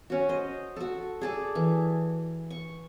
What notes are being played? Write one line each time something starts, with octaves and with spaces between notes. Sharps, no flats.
C#4 F#4
C5 D#5
F#4 A4
G#4 A4 D5
E3
C#6